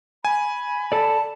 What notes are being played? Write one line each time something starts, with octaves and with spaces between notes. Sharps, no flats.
G#5 B5
A4 D5 A5